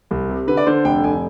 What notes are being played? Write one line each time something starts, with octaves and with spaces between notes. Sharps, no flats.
C2
C3
D3 B4
D5
D3 C5
F1 G5
F1 G#5